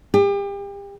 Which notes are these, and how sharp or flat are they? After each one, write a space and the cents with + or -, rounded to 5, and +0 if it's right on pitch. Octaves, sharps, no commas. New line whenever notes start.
G4 +35